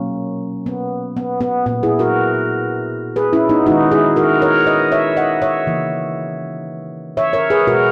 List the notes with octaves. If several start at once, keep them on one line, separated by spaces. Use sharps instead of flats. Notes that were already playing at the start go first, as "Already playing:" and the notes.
Already playing: B2 F#3 A#3 C#4
B3
B3
B3
A#2 A#3 B3
E4 G#4
F#4 A#4
G#4 B4
C#4 E4
B3 D#4
D#3 G#3 D#4 F#4
E4 G#4
F#4 A#4
A#4 C#5
B4 D#5
C#5 E5
D#5 F#5
C#5 E5
C#3 E3 A#3
C#5 E5
A#4 C#5
G#4 B4
B2 G#3 F#4 A#4